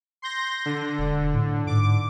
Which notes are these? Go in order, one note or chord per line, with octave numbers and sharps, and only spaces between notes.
C6 G6 A#6
D3
E1
A2
G#2 D6